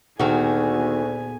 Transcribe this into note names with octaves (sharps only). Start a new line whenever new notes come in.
D2 A#2 D#3 B3 F#4 G#4 A4 G#5